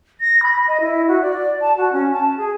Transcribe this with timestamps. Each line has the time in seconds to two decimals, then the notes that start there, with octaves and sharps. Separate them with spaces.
0.21 A#6
0.43 B5
0.67 D#5
0.80 E4
1.08 F#4
1.21 D5
1.61 A5
1.77 F#4
1.92 C#4
2.12 A5
2.37 G#4